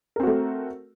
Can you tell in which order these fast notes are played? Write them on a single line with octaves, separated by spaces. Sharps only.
A#4 C4 F#4 A3